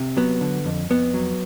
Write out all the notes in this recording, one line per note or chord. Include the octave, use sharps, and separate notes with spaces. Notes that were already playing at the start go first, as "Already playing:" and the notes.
Already playing: C3
F#3 B3
D3
F2
F2 B3
F#3